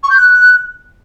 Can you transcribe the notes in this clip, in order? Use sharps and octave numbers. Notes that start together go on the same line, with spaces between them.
C#6
G6
F#6